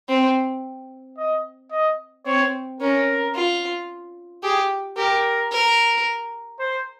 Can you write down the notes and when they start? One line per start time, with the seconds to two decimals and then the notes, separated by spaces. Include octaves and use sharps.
0.09 C4
1.17 D#5
1.71 D#5
2.26 C4 C#5
2.80 C#4 A#4
3.35 F4
4.43 G4 G#4
4.97 G4 A#4
5.52 A#4
6.60 C5